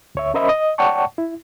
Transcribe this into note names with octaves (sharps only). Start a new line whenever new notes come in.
D2 C#5 E5
C#4 A#4 C5 D#5 E5 B5
D#5
C#5 D5 F#5 G5 A5 C#6
E4